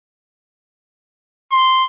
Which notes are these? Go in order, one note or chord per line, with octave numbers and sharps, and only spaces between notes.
C6